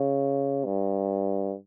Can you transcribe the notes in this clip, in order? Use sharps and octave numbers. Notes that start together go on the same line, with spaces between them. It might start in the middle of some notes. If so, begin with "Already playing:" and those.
Already playing: C#3
G2